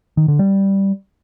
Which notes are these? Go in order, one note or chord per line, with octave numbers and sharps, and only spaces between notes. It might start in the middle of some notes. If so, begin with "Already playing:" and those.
D#3
D3
G3